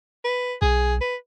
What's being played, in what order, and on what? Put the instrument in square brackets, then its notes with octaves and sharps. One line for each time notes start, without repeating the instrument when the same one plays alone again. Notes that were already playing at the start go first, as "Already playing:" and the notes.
[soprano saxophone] B4
[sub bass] B1 [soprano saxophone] G#4
[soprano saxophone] B4